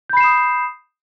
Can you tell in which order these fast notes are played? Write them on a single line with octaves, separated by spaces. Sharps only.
G6 B5 C7 E7 D#6